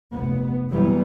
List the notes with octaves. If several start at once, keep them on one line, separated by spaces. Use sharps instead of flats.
F1 B3
F2 A#2 E3 F#3 G3 B3